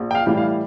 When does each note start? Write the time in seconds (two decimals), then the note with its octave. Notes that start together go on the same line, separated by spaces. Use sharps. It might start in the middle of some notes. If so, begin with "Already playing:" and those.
Already playing: A#1
0.11 G5
0.15 F5
0.26 A2 E3 G3
0.37 F5